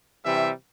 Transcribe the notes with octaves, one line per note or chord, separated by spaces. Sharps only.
C3 E3 G3 E5